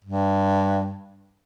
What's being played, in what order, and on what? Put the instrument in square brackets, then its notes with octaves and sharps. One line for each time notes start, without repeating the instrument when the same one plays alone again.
[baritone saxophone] G2